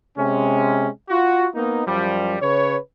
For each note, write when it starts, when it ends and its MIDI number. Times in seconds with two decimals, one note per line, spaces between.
0.18 0.88 48
0.18 0.88 56
0.18 0.88 61
1.09 1.47 65
1.09 1.47 66
1.55 1.83 58
1.55 1.83 59
1.55 1.83 63
1.87 2.37 42
1.87 2.37 53
1.87 2.37 55
2.41 2.77 49
2.41 2.77 71
2.41 2.77 73